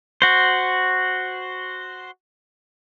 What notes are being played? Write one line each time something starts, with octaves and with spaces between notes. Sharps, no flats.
F#4 C5